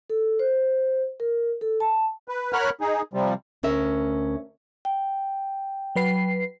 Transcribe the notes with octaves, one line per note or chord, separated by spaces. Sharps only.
A4
C5
A#4
A4
A5
B4
A#4 C#5 F#5 B5 F6 F#6
D#4 G#4
C3 F3 G3
D2 C#4 A#4 E5
G5
F#3 B4 C7